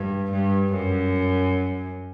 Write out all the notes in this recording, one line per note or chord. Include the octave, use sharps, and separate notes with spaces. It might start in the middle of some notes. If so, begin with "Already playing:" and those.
Already playing: G2
G2
F#2